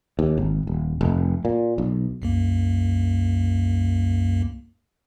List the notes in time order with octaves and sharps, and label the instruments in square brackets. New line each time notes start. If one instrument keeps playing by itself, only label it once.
[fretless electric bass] D#2
G#1
D#1
F1
A#2
B1
[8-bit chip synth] C2 F#2 A#3